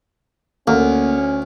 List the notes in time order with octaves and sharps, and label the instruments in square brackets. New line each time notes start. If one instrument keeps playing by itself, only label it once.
[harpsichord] D2 [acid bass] A#3 [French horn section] C#4